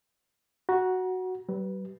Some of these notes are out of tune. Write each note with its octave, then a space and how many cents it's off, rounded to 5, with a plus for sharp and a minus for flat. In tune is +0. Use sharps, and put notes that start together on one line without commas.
F#4 +0 A#5 +40
G3 -45 B4 +0